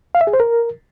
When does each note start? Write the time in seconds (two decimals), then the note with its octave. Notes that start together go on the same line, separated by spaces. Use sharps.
0.15 F5
0.21 E5
0.27 G#4
0.33 C5
0.40 A#4